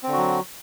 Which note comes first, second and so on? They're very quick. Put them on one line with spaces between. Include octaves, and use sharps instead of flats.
C4 D3 F#4 F#3